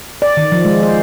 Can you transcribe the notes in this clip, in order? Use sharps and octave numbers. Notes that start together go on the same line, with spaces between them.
D5
D#3
F3
G#3
C5